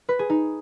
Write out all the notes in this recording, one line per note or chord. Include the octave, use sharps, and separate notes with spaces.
B4
G#4
D#4